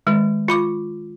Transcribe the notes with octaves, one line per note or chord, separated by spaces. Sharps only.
D#3 G#3
F4 B5 D6